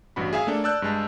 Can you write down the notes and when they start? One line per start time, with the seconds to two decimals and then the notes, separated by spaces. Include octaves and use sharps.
0.16 A1 G2 F#4 B5
0.33 G#4 E5 F5 G#5
0.47 A3 A#3 D4 A4
0.64 D5 A5 E6 F#6 G6
0.82 G2 G#3 A5